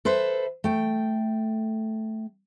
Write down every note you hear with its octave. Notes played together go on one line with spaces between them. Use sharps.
A4 B4 C5 E5
A3 G5